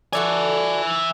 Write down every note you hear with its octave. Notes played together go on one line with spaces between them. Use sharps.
F#4 A4 D5 E5 G#5